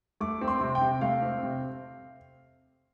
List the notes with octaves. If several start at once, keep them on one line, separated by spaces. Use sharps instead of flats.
A3 D6
C4
C6
C3
G5
C3
A3 F5
C4
C3